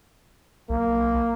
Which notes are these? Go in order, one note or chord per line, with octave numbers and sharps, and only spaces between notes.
B1 A#3